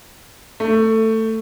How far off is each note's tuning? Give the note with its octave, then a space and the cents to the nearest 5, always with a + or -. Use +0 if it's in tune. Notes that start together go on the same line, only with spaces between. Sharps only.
A3 +15